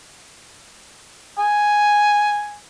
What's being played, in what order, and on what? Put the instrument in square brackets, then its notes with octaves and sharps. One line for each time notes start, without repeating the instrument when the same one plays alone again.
[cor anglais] G#5